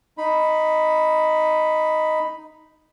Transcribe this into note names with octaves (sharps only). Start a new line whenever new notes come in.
D#4 B5